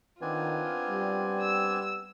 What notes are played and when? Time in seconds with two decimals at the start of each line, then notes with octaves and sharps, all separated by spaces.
0.22 D#3 B3 C4 D4 F4 G#5
0.87 G3
1.41 E6